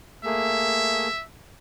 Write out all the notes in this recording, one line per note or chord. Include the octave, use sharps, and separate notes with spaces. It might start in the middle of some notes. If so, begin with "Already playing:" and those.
A3 A#3 G#4 E5